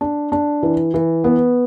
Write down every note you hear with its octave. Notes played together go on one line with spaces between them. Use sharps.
D4
D4
E3
E3
B3